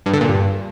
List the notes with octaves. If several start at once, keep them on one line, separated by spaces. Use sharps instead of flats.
G2
D3
A#2
G2